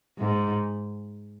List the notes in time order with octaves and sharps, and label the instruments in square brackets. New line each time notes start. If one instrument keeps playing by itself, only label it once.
[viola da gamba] G#2